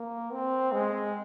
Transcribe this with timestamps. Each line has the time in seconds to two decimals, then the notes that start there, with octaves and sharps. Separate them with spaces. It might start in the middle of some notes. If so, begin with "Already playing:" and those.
Already playing: A#3
0.32 C4
0.72 G#3